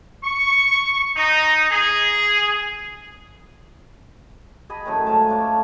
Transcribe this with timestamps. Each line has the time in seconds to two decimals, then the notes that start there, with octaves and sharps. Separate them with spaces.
0.23 C#6
1.15 D#4
1.71 G#4
4.70 G#4 D#5 B5
4.86 F#2 A2 D#3
5.06 G#2 F4 C#5 A5
5.29 A3 D4 C#5